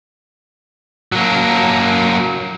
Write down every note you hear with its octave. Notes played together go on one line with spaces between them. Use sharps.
F#3 A#3